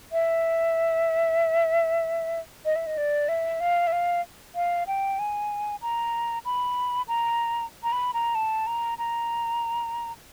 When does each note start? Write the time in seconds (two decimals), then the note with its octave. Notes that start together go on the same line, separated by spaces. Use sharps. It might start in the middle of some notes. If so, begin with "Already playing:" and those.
0.12 E5
2.65 D#5
2.76 E5
2.87 D#5
2.97 D5
3.29 E5
3.60 F5
3.87 E5
3.92 F5
4.55 F5
4.87 G5
5.19 G#5
5.82 A#5
6.45 B5
7.08 A#5
7.83 A#5
7.92 B5
8.14 A#5
8.35 A5
8.67 A#5
8.98 A#5